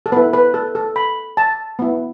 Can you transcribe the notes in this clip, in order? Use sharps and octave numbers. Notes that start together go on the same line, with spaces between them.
A4
B3 E4 B4
B4
A4
A4
B5
A5
B3 E4